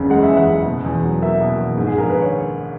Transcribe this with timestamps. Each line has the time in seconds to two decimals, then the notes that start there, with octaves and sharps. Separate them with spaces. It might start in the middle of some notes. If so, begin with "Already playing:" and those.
Already playing: F#1 E2 C#3
0.10 G#3 F#5
0.23 E5
0.28 E2
0.37 F#5
0.47 F#1
0.66 B2
0.85 E2
1.04 F#3
1.22 A#3 E5
1.41 B2
1.58 E2
1.77 G#2
1.87 G#4
1.96 A#1 A#4
2.10 B4
2.15 D#3
2.22 C#5